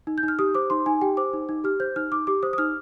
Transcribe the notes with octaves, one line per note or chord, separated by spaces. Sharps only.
D#4
G6
D#4
F6
G4 D#6
C5 D6
D#4 C6
D#4 G#5
G4 G5
C5 D6
D#4
D#4
G4 F6
C5 G6
D#4 F6
D#4 D6
G4 D6
C5 D#6
D#6
D#4 F6